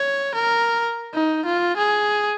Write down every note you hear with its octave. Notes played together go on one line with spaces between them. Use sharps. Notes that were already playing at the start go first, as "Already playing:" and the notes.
Already playing: C#5
A#4
D#4
F4
G#4